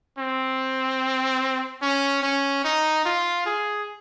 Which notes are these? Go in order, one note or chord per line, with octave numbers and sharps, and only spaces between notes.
C4
C#4
C#4
D#4
F4
G#4